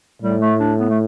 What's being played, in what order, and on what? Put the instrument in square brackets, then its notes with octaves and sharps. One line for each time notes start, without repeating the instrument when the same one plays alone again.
[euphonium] A2 [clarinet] G3
[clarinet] A3
D4
B3
A3